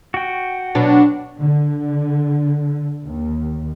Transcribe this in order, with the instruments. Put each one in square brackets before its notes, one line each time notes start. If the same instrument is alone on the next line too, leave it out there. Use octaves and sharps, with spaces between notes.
[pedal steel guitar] F#4 G5
[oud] B2 F#3 [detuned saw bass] D4
[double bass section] D3
D#2